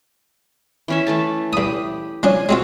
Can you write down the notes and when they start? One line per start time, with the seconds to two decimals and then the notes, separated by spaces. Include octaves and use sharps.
0.88 E3 C#4 E5
1.07 E3 A3 A5
1.53 E2 G4 B5 D#6
2.23 F3 C#4 D4 G#5
2.49 G#3 C4 F4 F#4